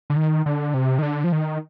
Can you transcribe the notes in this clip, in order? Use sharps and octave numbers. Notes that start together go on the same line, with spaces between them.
D3
D#3
D3
C3
D#3
D3
F3
D#3